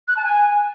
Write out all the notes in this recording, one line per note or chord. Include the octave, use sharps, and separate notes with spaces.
F#6
A5
G#5